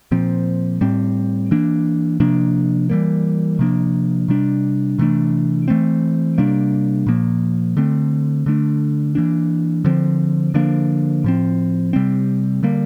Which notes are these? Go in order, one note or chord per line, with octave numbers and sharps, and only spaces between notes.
A#2 F3 C4
A2 G3 C4
E3 A#3 D4
C3 F3 A#3 D4
E3 G3 A#3
C3 F3 A#3 D4
C3 G3 D4
C3 E3 A3 D4
E3 A3 C4
C3 G3 A#3 D4
A#2 F3 A#3
D3 A3 C4
D3 A3 D4
E3 A#3 D4
D3 F3 C4
D3 F3 A#3 D4
A2 F3 C4
C3 G3 C4
D3 G3 A#3